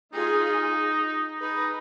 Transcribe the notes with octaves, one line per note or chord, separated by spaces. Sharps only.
D#4 F4 G#4
D#4 G#4 B4